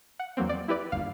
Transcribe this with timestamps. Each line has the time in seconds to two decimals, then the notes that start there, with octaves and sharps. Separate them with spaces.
0.19 F#5
0.37 E2 F#3 A#3 C4
0.49 D5
0.68 E4 G4 B4 D5
0.92 G1 D#2 F5